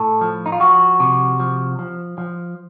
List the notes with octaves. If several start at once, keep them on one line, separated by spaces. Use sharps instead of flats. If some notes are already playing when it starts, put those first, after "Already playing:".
Already playing: A2 A4
F3
D#4
F4
F3 F#4
C3
F3
F3
F3